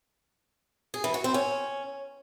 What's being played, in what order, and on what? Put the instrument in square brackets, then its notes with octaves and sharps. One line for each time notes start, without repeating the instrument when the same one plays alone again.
[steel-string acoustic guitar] G#4
E3
F#4
C4
C#4